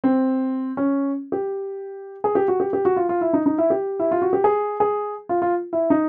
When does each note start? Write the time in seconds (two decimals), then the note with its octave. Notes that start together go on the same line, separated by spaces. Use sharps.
0.04 C4
0.77 C#4
1.32 G4
2.24 G#4
2.35 G4
2.48 F#4
2.60 G4
2.73 G4
2.85 F#4
2.97 F4
3.09 F4
3.21 E4
3.33 D#4
3.46 D#4
3.58 E4
3.70 G4
4.00 E4
4.11 F4
4.22 F#4
4.33 G4
4.44 G#4
4.80 G#4
5.29 F4
5.42 F4
5.73 E4
5.90 D#4